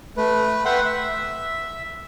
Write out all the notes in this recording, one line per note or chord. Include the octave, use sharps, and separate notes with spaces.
A3 B4
B4 E5 F#5 G5 C6
E5